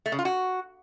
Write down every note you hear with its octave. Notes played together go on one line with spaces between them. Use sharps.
A3
C#3
F4
F#4